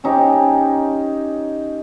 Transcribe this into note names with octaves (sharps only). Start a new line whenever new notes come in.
C#4 D#4 G4